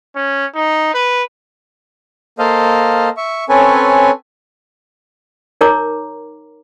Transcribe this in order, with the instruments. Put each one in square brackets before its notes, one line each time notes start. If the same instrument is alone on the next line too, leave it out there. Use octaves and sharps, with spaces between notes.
[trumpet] C#4
D#4
B4
[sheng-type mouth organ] A#3 A4 C5 D#5 F5
E5 C#6
C4 C#4 A4 B4 C#5 G#5
[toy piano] D#4 A#4 C#5 A#5 D6